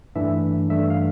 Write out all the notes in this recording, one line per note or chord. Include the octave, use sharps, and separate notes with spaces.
G2 E3 A3 D4 E5
G2 E3 A3 D4 E5
F5